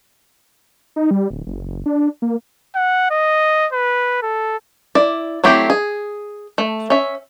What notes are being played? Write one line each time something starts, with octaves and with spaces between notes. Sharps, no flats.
D#4
G3
D1
F#1
D4
A#3
F#5
D#5
B4
A4
E4 D5
F#3 A3 C4 E4 G4
G#4
A3
C#4 E5